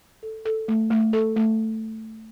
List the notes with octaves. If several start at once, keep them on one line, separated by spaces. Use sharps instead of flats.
A4
A4
A3
A3
A4
A3